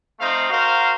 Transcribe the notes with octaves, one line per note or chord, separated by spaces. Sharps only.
A3 C4 D#4 F5
F#4 A#4 C5 F5